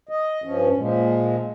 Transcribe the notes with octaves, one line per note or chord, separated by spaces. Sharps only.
D#5
G2 F3 C#4
A#2 F3 G#3